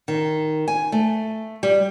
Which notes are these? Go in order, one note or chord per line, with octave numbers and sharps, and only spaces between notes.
D#3
G#5
A3
G3